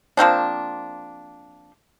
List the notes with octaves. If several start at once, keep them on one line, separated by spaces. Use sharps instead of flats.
F3 A#3 C4 D4